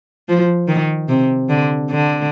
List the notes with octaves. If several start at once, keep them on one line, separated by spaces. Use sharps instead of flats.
F3
D#3
C3
D3
D3